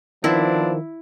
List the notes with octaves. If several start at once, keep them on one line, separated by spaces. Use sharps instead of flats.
D#3 F3 B3 C4 D4 E4